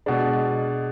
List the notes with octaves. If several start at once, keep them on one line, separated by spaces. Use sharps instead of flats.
B2 G#3 D4